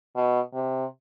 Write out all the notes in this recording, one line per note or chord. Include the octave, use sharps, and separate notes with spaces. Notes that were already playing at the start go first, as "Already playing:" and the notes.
B2
C3